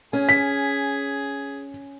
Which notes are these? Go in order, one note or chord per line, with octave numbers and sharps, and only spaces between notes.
C#4 G#4
B6